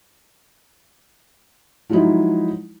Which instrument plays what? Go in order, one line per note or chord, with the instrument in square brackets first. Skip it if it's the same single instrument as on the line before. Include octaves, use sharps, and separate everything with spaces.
[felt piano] F3 F#3 G#3 D#4 E4